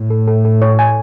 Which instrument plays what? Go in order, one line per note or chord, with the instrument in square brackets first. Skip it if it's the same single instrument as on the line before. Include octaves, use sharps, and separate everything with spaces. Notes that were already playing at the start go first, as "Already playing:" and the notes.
Already playing: [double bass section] A2
[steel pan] A4
A4
A4
C#5
G#5